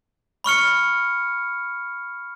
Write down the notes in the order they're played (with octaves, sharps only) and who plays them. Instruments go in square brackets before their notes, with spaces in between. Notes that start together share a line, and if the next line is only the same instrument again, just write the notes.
[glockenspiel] B5 C#6 F6 C#7